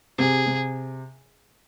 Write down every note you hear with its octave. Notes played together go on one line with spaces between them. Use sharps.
C3 G#4
C3